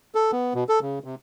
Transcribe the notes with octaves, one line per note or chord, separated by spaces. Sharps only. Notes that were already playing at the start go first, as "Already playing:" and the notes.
A4
B3
B2
A4
C#3
C3